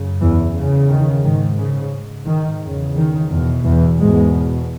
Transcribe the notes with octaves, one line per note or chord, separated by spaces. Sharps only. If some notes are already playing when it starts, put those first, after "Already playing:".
Already playing: F#2 C#3
E2 E3
E2 C#3
D#3
G#2 D#3
C#3
G#2
D#3
E2 C#3
D#3
E2 B2
E2 E3
E2 G#2 B2 G#3